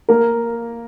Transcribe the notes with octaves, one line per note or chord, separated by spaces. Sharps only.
A#3 A#4